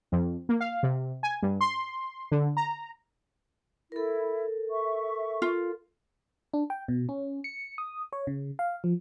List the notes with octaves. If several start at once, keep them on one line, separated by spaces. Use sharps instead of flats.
F2
A#3
F5
C3
G#5
G2
C6
D3
A#5
E4 A4 A#4
E5 C#6
F4
D4
G5
B2
C#4
C#7
D#6
C#5
C#3
F5
F3